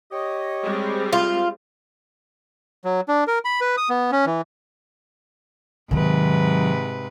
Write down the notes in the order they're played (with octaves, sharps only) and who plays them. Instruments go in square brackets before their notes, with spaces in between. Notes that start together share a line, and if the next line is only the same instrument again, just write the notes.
[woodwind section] G4 C#5 D#5
[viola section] G3 G#3 C4
[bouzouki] F4
[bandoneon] F#3
D4
A#4
B5
B4
D#6
B3
C#4
E3
[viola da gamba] G#2 C3 B4 [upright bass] D#3 F#3